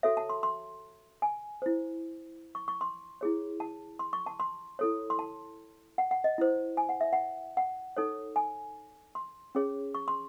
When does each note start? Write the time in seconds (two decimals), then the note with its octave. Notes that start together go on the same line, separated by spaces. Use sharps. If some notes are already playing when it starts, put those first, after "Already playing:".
0.03 F#4 A4 C#5 E5
0.17 A5
0.29 C6
0.43 C6
1.22 G#5
1.62 E4 C5
2.55 C#6
2.68 C#6
2.81 C6
3.21 E4 G#4 C#5
3.60 A5
3.99 C6
4.13 C#6
4.26 A5
4.40 C6
4.79 E4 A4 C#5
5.10 C6
5.19 A5
5.98 F#5
6.11 F#5
6.24 D#5
6.38 E4 C5
6.77 G#5
6.89 F#5
7.01 E5
7.13 F#5
7.57 F#5
7.97 D#4 A4 C#5
8.36 G#5
9.15 C6
9.55 C#4 G#4 C#5
9.95 C#6
10.08 C6